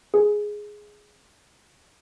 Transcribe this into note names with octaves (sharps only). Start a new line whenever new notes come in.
G#4